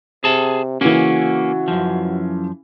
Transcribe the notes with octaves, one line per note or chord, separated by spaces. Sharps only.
C3 G#4 A5
C#3 E3 A#3 C#4 F#4
F#2 F3